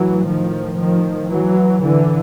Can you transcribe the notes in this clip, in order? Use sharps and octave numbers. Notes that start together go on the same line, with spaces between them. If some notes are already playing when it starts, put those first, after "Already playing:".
Already playing: A2 E3 F#3
D#3 F3
D#3 F3
E3 F#3
A2 D3 E3